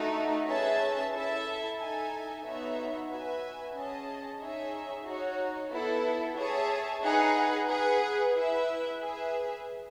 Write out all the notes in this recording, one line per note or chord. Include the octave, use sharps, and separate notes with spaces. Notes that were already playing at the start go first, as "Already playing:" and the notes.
Already playing: A3 D#4 F#4
C#4 G#4 B4 E5 A5
E4 A4 E5 A5
D#4 A4 E5 G#5
B3 D#4 F#4 C#5 E5
F#4 B4 E5 G#5
C#4 G#4 D#5 A5
D#4 G#4 C#5 E5
D#4 F#4 C#5
B3 E4 A4
G#4 C#5 E5 A5
D#4 G#4 B4 F#5
G#4 B4 F#5
E4 B4 E5
G#4 B4 E5